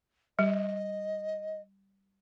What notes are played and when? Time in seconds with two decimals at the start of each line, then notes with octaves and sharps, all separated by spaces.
0.39 G3 D#5